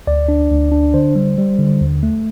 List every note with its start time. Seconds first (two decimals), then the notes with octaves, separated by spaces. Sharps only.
0.07 D2 D5
0.28 D4
0.51 D2
0.72 D4
0.94 D3 C5
1.16 G3
1.38 G3
1.59 D3
1.81 D#2
2.03 A3